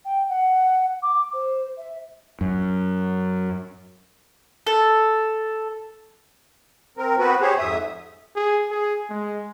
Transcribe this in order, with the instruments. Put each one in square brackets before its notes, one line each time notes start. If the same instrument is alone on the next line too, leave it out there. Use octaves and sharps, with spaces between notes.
[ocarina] G5
F#5
D6
C5
E5
[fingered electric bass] F#2
[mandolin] A4
[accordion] C4 A#4
B3 C4 F#4 B4
G4 G#4 C5 C#5
F2 G#2 E5 D#6
[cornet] G#4
G#4
G#3